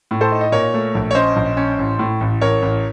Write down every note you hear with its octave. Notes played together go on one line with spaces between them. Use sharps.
A2
A4 C5
D#4
D#5
A#2 A#4 C#5
A3
A#1
C#5
C#4 C5 D#5
A#1
C#4
A1
A2
A1
A1 A#4 C#5
A1